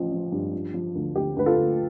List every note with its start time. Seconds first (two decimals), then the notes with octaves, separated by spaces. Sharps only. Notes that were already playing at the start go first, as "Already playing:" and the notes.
Already playing: A1 F3
0.12 F3
0.32 G2
0.53 F3
0.74 F3
0.95 D2
1.15 D2 G4
1.36 D2 B4
1.46 F4 A4
1.58 D2